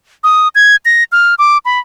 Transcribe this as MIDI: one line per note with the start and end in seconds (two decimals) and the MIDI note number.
0.24 0.48 87
0.55 0.76 92
0.85 1.04 94
1.12 1.35 89
1.39 1.58 86
1.65 1.79 83